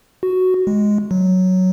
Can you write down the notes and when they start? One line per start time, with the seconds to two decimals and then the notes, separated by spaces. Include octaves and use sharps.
0.23 F#4
0.67 G#3
1.11 F#3